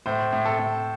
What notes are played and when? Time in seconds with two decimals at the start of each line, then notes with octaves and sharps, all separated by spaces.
0.06 A2 C5
0.32 A2
0.45 A4
0.59 A2